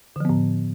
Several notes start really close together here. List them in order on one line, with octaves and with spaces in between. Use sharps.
D3 F3 B3 A2